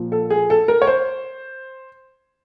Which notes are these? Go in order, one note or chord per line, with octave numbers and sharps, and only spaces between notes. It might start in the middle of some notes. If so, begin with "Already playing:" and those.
Already playing: A#2 F3
A4
G#4
A4
A#4
C#5
C5